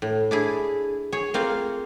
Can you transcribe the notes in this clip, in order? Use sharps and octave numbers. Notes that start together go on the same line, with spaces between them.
A2
D4 E4 G#4
G#4 C#5
A#3 C4 F4 F5